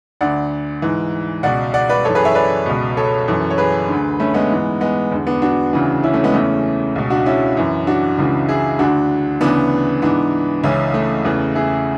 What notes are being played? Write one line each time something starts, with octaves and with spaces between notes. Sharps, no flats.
D2 D3 D5 F#5
G#2 E3
C#2 B2 D5 F#5
D5 F#5
B4 D5
F#2 E3 A4 C#5
G#4 B4
C#5 E5
B4 D5
C#2 B2
A4 C#5
F#2 E3
C#5
G#4 B4
D2 D3
A3 C#4
G#3 B3
G#2 E3
G#3 B3
E2 D3
B3 D4
D4 F#4
D2 C#3 E3
C#4 E4
A3 C#4
G#3 B3
E2 C#3 E3 A3 C#4
C#2 B2
D4 F#4
C#4 E4
F#2 E3
D4 F#4
C#2 C#3 E3
E4 G#4
D2 D3 D4 F#4
D2 C#3 E3 B3 D4
G#2 E3 B3 D4
C#2 C#3 E3 C#4 E4
A3
E2 C#3 E3
E4 G#4